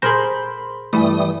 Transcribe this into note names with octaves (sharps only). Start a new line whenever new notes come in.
A#2 G#4 A#4 C5 B5 C6 A#6
G2 E3 G3 A3 E4 B5 D#6